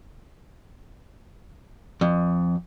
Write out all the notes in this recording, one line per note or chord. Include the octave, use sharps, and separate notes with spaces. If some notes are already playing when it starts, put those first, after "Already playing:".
F2